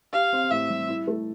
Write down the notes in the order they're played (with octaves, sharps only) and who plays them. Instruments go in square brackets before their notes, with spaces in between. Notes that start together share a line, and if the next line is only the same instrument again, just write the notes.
[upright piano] G4 [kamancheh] F5
[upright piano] C4
[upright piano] A2 [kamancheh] E5
[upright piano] G3
E4
A3